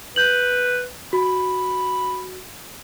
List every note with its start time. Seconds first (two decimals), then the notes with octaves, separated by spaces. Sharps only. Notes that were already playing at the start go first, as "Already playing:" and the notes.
0.16 B4 G6 F#7
1.13 F#4 B5